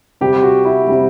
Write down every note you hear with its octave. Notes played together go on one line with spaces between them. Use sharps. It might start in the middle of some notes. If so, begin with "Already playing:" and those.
C3 G3 G4
F#4
E4
C3 G3